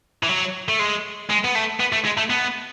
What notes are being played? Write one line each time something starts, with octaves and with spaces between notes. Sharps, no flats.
E3
F#3
A3
G#3
G#3
B3
A3
B3
A3
G#3
A3
B3